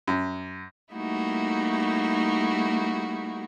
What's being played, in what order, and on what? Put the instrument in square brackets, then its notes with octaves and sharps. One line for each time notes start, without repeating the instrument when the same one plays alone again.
[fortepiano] F#2
[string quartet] G3 A3 A#3 D#4 E4 F#4